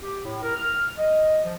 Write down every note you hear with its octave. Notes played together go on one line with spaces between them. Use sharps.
G4
A2
A#4
F6
D#5
F3